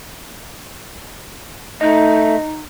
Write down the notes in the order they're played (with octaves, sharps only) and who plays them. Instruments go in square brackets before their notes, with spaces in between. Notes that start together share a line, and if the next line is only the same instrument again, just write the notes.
[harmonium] A3 [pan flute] D#4 [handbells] D#5